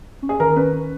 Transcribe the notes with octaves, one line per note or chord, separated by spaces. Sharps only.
C#4
G#4
D#3 A#4
C#4 B4
C#4